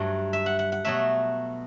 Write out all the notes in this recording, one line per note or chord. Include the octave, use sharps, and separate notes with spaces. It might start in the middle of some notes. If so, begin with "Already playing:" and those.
Already playing: G2 F#3 A3
E5
F#5
F#5
F#5
B2 F#3 A3 E5